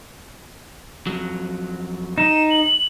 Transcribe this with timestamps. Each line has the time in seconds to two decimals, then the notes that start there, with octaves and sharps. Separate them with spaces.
1.07 F2 F#3
2.18 D#4 E7
2.50 F#7